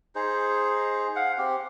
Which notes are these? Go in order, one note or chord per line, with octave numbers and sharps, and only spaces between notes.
D#4 G#4 C5
F5 F#5
C4 G4